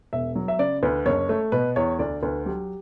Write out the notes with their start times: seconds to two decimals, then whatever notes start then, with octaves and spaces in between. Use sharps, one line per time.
0.13 E1 E5
0.36 F#3
0.48 E5
0.59 C#3 D5
0.83 D2 B4
1.06 F#1 C#5
1.29 A3
1.52 B2 B4
1.76 E2 C#5
1.99 D2 D5
2.23 D2 B4
2.46 F#3 G4